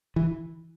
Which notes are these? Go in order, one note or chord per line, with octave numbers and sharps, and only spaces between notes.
E3